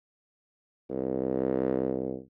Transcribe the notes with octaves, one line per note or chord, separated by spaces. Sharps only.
C2